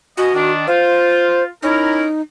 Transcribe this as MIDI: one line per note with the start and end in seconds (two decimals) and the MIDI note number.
0.17 0.29 47
0.17 0.29 61
0.17 0.52 66
0.17 0.29 75
0.34 0.65 51
0.34 0.65 62
0.67 1.46 65
0.67 1.43 72
1.63 2.05 61
1.63 2.21 63
1.63 2.05 64
1.63 2.05 70